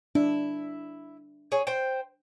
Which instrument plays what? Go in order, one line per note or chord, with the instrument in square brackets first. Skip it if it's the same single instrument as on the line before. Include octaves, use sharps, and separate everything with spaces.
[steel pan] D4 [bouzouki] E4
[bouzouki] G#4 C#5
C5 G5